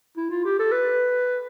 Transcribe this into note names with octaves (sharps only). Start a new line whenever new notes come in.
E4
F4
G4
A4
B4